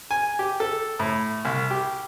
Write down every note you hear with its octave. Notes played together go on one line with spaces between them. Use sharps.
G#5
G4
A4
A2
C2
G4